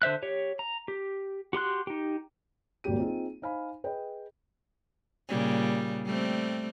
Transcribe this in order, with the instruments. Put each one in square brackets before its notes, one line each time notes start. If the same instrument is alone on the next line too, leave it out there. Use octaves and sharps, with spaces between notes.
[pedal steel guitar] D3 C5 E5 F#6
G4 C#5
A#5
G4
F#4 G4 C6 F#6
D#4 G4
[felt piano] D#1 G#1 A#3 F#4 G4 D#7
C4 D#4 F4 G#4
D#4 C5 F5 G#5 B5
G#4 B4 D#5 G5
[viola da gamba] A#2 C#3 G3
G3 A3 C4